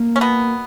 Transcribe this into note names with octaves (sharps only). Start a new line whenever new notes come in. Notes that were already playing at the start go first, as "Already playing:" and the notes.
Already playing: A#3
C#4
B2 B3